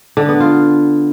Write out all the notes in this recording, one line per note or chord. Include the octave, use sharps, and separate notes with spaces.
D3
B3
F4